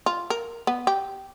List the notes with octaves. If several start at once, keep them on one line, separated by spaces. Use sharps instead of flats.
F4
A#4
B3
G4